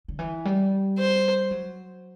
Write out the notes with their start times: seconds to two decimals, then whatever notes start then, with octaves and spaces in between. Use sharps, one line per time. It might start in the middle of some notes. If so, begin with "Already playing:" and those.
0.08 D3
0.19 E3
0.45 G3
0.99 C5
1.51 F#3